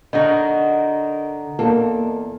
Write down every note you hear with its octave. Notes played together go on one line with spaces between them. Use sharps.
D3 D#4 F#4 A#4 D#5 F#5 A#5
E2 A#3 A4